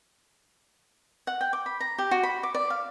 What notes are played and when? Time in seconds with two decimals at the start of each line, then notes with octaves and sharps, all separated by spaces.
1.27 F#5
1.41 G5
1.53 D6
1.66 B5
1.80 A#5
1.98 G4
2.11 F#4
2.23 B5
2.43 D6
2.55 D5
2.70 F5